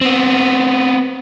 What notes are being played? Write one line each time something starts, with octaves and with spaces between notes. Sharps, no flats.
B3 C4